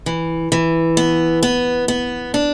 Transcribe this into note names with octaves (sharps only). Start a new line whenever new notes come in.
E3
E3
B3
B3
B3
D4